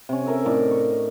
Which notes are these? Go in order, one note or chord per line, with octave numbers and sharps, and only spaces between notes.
C3 C#4
A4 A#4 E5
A2 D#4 A#4 D5
C#6